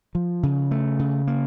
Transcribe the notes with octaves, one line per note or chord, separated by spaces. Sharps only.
F3
C#3
A3
C#3
A#3